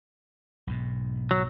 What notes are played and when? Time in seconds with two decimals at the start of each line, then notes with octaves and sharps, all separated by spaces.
0.67 B1 G#2 B2
1.31 F#3